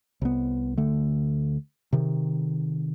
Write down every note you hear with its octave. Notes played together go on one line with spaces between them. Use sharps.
C2 B3
D2 D3 A3
C3 D#3